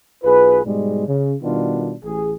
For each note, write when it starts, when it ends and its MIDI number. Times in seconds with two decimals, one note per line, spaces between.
0.24 0.61 35
0.24 0.61 65
0.24 0.61 68
0.24 0.61 71
0.65 1.04 44
0.65 1.04 47
0.65 1.04 55
0.65 1.04 56
1.07 1.34 49
1.43 1.94 47
1.43 1.94 51
1.43 1.94 55
1.43 1.94 59
1.43 1.94 62
1.43 1.94 65
2.04 2.34 33
2.04 2.34 68